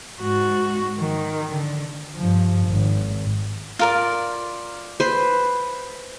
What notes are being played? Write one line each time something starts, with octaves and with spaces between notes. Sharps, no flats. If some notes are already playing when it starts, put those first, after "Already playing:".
G#2 F#4
D#3
D3
G2 F3
G#1
F4 A#4 D5
B4 C5